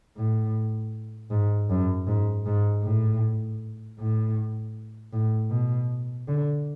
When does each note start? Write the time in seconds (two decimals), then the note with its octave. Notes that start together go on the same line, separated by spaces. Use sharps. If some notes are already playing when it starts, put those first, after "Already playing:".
0.17 A2
1.31 G#2
1.70 F#2
2.07 G#2
2.46 G#2
2.84 A2
3.99 A2
5.13 A2
5.50 B2
6.28 D3